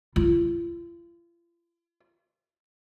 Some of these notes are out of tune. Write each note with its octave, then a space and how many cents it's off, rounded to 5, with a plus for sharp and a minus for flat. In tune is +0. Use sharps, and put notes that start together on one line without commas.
F4 -40